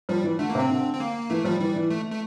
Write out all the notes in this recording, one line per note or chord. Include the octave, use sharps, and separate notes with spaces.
F3 G3
E3
D3 A3
A#3
C3
C4
D3
C4
A#3
E3 A3
F3 G3
E3 G3
E3
A3
A3